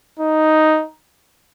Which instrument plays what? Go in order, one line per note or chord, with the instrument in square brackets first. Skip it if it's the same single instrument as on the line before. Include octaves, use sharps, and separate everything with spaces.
[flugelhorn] D#4